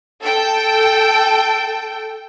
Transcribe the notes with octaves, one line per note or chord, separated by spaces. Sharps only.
A4 G5